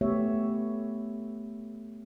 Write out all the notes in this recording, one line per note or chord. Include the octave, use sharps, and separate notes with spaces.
A3 B3 G4 C#5 E5